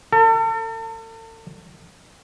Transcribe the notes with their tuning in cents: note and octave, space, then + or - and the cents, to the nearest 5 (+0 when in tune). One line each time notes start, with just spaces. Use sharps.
A4 +40